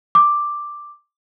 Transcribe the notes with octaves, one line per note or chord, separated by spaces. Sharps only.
D6